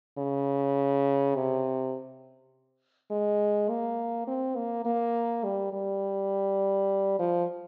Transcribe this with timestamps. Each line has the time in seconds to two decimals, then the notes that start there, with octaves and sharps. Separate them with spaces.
0.18 C#3
1.36 C3
3.11 G#3
3.69 A#3
4.27 C4
4.56 A#3
4.85 A#3
5.44 G3
5.73 G3
7.19 F3